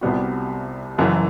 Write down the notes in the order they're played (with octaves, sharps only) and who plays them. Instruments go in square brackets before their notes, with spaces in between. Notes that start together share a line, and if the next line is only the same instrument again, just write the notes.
[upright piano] C2 C3 G3 B3 F#4
F#1 F#2 E3